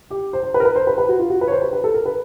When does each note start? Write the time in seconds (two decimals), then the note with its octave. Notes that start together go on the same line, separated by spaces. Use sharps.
0.11 G4
0.33 C5
0.43 C5
0.54 B4
0.60 A#4
0.65 B4
0.76 C5
0.87 B4
0.98 B4
1.09 F#4
1.19 F4
1.30 F#4
1.41 B4
1.48 C#5
1.52 C5
1.62 B4
1.73 B4
1.84 A4
1.94 A#4
2.06 B4